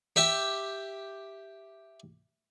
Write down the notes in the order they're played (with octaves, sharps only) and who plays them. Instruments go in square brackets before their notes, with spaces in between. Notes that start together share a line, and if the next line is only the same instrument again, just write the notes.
[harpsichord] G4 E5 G5